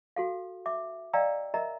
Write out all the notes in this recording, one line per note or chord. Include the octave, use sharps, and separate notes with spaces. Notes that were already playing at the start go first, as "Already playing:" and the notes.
F#4 A4 F5
E5 D6
D5 D#5 F5 G5 A#5 E6
A#4 D#5 E5 A#5